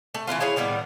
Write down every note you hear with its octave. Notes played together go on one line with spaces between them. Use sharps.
A3
E3 A3 B3 F4
E4 G#4 C#5 F5
A2 D#3 G3 B3